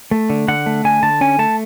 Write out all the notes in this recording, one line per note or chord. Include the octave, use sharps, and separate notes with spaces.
A3
D3
D3 F#5
A3
D3 G#5
D3 A5
C#4 G#5
A3 A5